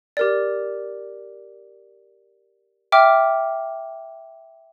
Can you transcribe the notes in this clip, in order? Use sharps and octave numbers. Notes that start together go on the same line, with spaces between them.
G4 A#4 D5
E5 G5 D6 F6